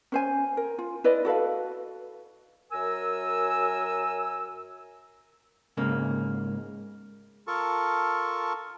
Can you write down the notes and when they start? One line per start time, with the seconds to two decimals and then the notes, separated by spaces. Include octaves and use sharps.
0.12 C#4 C5 G#5
0.57 A#4
0.78 F4
1.04 E4 B4 D5 D#5
1.25 F#4 A4 B4 F5
2.72 F#2 A#4 G#5 E6
5.77 G#2 C#3 A#3
7.47 F4 A4 A#4 A5 C#6